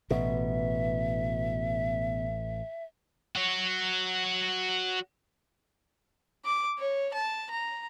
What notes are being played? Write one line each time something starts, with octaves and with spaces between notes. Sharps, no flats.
A1 B2 E5
F#4 C#5
D6
C#5
A5
A#5